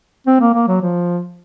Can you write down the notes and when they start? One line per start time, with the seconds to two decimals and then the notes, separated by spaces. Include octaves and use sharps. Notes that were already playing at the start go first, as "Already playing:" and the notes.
0.27 C4
0.41 A#3
0.54 A#3
0.68 F#3
0.81 F3